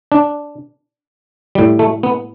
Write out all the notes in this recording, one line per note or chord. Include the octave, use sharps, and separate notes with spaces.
D4
A2 G3
A3
B3